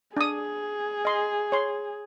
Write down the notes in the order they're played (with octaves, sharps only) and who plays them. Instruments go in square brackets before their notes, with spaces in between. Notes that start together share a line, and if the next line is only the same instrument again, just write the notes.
[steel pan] D4 D#6 [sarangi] G#4
[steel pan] D#5 C6
C#5 C6